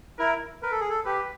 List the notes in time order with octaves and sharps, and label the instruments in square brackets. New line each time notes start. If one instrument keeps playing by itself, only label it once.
[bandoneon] E4 [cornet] A#4
[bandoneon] A#4 [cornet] B4
[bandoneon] A4
G#4
A4
[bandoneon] G4 [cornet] B4